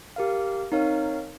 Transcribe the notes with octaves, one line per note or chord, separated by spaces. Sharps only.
G4 A#4 F5
C4 D#4 A#4 C#5 F5